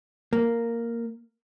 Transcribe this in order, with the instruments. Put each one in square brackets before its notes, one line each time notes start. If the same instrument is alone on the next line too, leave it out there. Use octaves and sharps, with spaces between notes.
[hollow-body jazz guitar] A#3